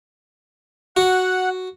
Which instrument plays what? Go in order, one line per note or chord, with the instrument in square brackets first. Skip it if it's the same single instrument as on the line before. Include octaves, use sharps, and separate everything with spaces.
[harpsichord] F#4 [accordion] F#5